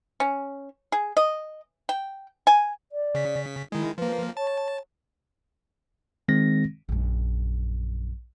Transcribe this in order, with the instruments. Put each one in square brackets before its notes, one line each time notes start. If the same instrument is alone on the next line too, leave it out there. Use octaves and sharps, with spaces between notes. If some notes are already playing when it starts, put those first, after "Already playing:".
[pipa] C#4
G#4
D#5
G5
G#5
[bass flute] D5
[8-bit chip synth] C#3 B6
[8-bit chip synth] D#3 G#3 [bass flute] E4
[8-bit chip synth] F3 A#3 [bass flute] B4
[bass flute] C#5 [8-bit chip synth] A5
[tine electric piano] D#3 G#3 C4 A#6
[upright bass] A#1 F#2